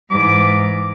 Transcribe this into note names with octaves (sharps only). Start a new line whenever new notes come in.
G#2 E3 D6